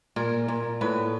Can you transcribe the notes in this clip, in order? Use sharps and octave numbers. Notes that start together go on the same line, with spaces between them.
A#2 A#4
A#2
A2 B4